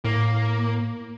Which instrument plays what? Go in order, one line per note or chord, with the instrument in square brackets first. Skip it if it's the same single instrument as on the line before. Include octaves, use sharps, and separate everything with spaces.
[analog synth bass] A2 [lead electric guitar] A#3